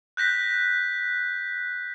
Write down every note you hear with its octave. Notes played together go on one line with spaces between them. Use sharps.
F#6 G6 A#6 B6